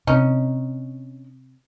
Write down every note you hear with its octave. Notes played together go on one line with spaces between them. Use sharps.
C3 C#4 D#4